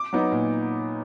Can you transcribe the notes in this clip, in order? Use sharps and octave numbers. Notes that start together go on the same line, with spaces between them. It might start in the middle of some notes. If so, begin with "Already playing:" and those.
Already playing: D6
F#3 B3 D#4
A#2